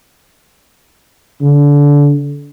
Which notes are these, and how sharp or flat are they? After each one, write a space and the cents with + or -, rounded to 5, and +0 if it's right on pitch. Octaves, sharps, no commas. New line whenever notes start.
D3 -25